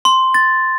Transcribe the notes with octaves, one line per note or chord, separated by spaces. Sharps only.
C6
A6